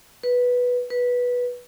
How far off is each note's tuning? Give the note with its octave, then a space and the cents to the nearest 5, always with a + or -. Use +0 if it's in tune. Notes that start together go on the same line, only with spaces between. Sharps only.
B4 -5
B4 -10